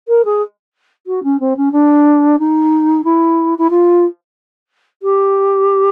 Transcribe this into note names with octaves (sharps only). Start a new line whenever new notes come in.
A#4
G#4
F#4
C#4
C4
C#4
D4
D#4
E4
E4
F4
G4